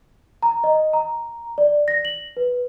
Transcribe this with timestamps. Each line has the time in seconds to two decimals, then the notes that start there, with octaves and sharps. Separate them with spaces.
0.43 A#5
0.64 D#5
0.93 A#5
1.58 D5
1.88 A#6
2.05 F#7
2.37 B4